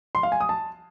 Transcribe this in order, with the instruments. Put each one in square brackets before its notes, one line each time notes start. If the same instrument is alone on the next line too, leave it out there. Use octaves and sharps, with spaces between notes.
[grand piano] C6
F5
G#5
D#6
A5